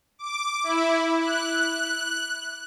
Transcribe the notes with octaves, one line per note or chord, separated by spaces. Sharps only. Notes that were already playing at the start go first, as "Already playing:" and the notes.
D6
E4
F#6